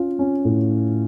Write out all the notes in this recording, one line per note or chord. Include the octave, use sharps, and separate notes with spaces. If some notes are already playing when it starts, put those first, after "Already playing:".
Already playing: C#4 F4
C#4
A2